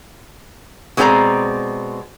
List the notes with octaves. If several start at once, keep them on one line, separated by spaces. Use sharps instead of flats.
B2 G#3 C4 G4 D5 A#5